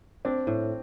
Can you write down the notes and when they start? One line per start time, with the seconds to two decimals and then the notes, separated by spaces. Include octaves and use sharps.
0.25 C4 D4
0.47 A2